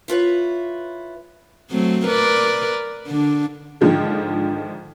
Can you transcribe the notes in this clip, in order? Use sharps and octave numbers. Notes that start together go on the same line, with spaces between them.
E4 F4 B4 C#5
F#3 A3 C4
A#4 B4 D5
D3 D4
G#2 D3 D#3 F3 G#3